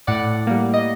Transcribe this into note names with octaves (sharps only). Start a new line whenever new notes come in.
A2 D5 F#5
G3 A#3
D#5